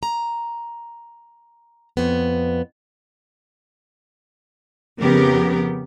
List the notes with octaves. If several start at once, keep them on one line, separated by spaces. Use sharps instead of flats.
A#5
F2 B3
F2 C#3 B3 G4 A#4